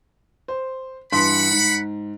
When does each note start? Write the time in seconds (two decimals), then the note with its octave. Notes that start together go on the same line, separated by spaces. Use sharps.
0.48 C5
1.12 G2 E3 F#5 B5 C6
1.51 G#2